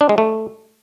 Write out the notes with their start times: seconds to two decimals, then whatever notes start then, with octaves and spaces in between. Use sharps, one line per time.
0.01 D4
0.09 G#3
0.18 A3